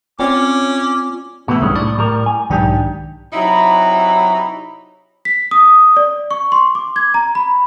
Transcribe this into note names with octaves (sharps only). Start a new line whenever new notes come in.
C4 C#4 F4 C#5 D5 D6
B2 E3 A3 B3 E4
C2 G2 D#3 G#3 C#4
A2 D5
A2 G3 A#4
G#5
B1 G#2 D#3 D4 G4
C3 F#3 D#4 E4 A#5 B5
B6
D#6
D5
C#6
C6
D6
G#6
A#5
B5